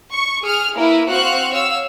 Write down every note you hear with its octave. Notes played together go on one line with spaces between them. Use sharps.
C#6
G#4 F6
A#3 E4 A#4 B4
C4 F#4 C5 F5 C#6 F#6
C#5 F5 E6